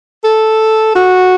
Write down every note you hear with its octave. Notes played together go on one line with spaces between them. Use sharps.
A4
F#4